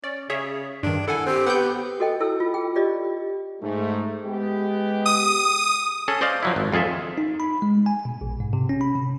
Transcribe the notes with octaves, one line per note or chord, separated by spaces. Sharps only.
C#4 D5
C#3 G#4 C#5 E5
G2 D#3 D4
E4 A4 F#5 G#5
C4 G4
B3 F#5 G5 G6
F#4 A4 D#5 G5
E4 A4 E6
F4
G#4 G5
F4 G4 D5 D#5
G#2 A3
G#3 B3 G4
D#6
C#4 G#4 A4
C5 D5 D#5 F5
F3 F#3 E4
G#1
F2 F4 G#4 A4 E5
D#4
B5
G#3
G#5
B2
A#1
G#2
C3
C#4
B5
C3